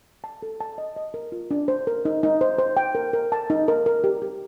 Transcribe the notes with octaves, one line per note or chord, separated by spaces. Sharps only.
A5
A4
A5
D#5
D#5
A#4
F4
D4
C5
A#4
D#4
D#4
C5
C5
G5
A#4
A#4
A5
D#4
A#4
A#4
G4
G4